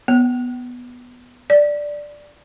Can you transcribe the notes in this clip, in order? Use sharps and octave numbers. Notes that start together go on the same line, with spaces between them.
B3
D5